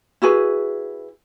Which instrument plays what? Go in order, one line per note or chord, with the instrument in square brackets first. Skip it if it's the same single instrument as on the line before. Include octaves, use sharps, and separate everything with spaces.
[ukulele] E4 F#4 G#4 B4